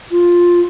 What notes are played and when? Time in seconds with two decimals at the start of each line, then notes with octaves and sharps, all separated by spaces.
0.11 F4